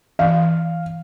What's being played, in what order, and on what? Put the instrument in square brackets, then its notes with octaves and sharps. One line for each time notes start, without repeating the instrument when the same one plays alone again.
[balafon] E3 [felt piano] F5